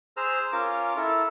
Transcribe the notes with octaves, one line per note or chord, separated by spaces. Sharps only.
G#4 C5 A#5 E6 F6
C#4 F4 A#4 D6
E4 A4 A#4